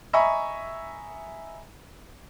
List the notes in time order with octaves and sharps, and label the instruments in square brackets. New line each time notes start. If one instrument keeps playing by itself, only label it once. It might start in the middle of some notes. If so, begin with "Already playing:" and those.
[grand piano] D#5 E5 G#5 A#5 B5 C#6